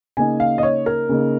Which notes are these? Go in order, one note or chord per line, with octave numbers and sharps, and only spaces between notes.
C#3 A#3 D#4 G#5
F5
D#5
C#5
A#4
C#3 A#3 D#4